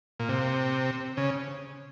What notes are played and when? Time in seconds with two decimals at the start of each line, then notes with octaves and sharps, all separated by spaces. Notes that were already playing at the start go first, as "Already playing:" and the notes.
0.20 A#2
0.29 C3
1.17 C#3